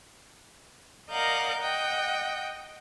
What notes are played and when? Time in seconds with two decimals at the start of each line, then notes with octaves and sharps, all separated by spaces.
1.10 A#4 D5 D#5 F5 F#5 G6
1.60 D#5 F#5 G5